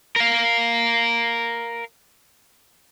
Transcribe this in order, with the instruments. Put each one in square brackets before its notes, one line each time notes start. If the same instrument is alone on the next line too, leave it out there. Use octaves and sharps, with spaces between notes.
[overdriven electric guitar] A#4 F5